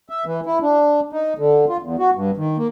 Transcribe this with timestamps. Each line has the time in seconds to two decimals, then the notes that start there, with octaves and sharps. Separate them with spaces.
0.10 E5
0.26 E3
0.46 E4
0.62 D4
1.13 D#4
1.38 D3
1.69 F4
1.82 E2
1.99 F#4
2.15 G2
2.37 D#3
2.57 A#3